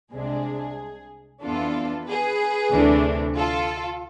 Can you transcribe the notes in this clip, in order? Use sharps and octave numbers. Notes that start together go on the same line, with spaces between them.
C2 C3 G#3 D4 G#4
F2 E3 B3 D4 F4 A4
G#4 B4
D2 C3 E3 A3 D4
F4 A4